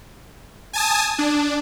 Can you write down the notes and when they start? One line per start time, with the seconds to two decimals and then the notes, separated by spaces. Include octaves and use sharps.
0.73 G#5 A5 D#6
1.19 D4